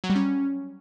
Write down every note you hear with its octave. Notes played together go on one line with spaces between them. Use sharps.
F#3
G3
C#4